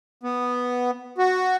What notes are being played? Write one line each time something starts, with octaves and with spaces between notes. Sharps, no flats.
B3
F#4